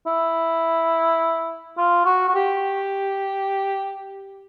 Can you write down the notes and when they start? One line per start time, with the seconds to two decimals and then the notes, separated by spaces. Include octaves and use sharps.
0.07 E4
1.77 F4
2.05 F#4
2.28 F#4
2.35 G4